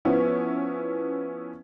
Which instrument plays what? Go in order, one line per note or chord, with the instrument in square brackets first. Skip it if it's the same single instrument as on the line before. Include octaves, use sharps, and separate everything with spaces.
[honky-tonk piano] F3 B3 C#4 E4